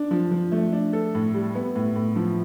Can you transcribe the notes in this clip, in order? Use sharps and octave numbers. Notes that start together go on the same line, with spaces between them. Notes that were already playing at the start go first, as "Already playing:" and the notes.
Already playing: D4
F3
F3
A3
D4
A4
A2
G3
B3
A2
A2
F3